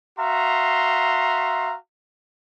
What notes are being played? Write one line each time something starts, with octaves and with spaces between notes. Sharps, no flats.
F#4 E5 F5 A#5 C6